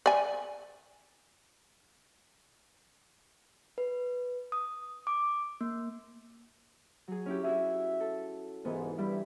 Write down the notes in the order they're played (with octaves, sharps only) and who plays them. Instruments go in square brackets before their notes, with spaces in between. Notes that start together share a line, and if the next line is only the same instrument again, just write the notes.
[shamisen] D5 G#5
[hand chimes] B4
D#6
D6
A#3
[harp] F#3 G#4
C#4 E4 G4
[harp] E4 F#4 G#4 [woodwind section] E5
[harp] A4
[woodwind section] C2 G#2 [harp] E3 B3
[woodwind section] G2 E4 [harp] G3